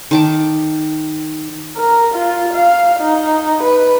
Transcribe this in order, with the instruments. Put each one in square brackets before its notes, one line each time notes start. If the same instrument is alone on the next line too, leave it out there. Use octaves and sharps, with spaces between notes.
[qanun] D#3 A5 D6
[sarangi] A#4
F4
F5
D#4
B4